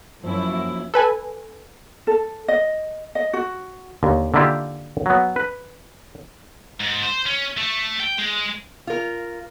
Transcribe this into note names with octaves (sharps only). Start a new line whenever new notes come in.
F#2 F3 A#3 C#4 E4
A4 B4 G#5
A4
D#5
D#5
F#4
D#2 D3
D3 D#3 A#3 E4 F4 G4
F#3 B3
B4
G#2
C5
C#4
A3
G5
G#3
F4 A#4